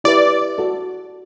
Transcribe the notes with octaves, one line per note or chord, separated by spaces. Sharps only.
E4 G4 B4 D5 E5
F#4 A4 D5